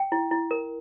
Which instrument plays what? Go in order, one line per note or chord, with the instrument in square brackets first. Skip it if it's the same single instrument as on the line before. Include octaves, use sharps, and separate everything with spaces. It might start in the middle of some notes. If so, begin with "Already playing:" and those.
Already playing: [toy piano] G5
E4
E4
A#4